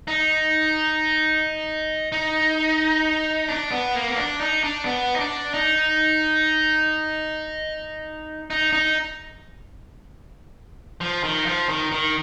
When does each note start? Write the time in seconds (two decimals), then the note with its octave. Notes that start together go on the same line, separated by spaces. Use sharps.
0.08 D#4
2.12 D#4
3.49 D4
3.71 B3
3.95 A#3
4.08 B3
4.17 D4
4.41 D#4
4.64 D4
4.85 B3
5.16 D#4
5.20 D4
5.54 D#4
8.50 D#4
8.73 D#4
11.01 F3
11.24 D#3
11.46 F3
11.69 D#3
11.91 D#3